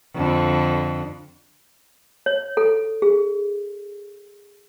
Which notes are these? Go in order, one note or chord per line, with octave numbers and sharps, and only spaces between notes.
F2 D3
C#5
A4
G#4